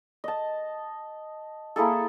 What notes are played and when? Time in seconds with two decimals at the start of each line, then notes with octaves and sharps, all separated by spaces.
0.24 D#5 A5
1.76 A#3 E4 G#4 A4